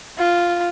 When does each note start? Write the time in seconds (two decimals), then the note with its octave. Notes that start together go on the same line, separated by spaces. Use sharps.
0.19 F4